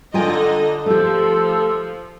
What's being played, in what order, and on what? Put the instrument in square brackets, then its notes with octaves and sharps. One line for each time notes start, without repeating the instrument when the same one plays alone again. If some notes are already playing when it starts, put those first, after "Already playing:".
[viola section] D3 D#4 D#5 [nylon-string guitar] F4 G5 G#5
[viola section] F3 [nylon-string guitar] A3 G4 [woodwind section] A4